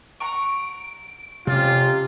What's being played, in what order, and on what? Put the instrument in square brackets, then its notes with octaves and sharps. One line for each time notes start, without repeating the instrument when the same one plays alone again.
[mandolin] F#5 A#5 C#6 [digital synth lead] D7
[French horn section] F2 C#4 G4 [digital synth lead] C3 [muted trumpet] F4